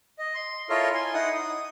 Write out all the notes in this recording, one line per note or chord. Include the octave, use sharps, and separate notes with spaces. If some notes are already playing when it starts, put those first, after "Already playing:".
D#5
C6
E4 F4 A4 A#4 C#5 D#5
G#5 C6
D#4 E4 F#5 D#6
D#6